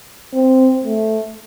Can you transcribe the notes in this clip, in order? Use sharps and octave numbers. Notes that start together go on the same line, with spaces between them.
C4
A3